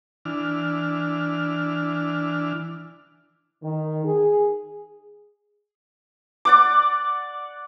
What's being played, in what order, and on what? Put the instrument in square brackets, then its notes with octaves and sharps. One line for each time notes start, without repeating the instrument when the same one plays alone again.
[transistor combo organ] E3 D4 F6
[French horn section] D#3
G#4
[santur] D5 F#5 D6